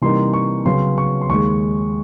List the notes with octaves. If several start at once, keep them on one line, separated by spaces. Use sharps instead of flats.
C3 E3 G3 A#3 D#4 C6
C#6
C#3 F#3 B3 C6
C#6
C6
D#2 D#3 G#3 C#6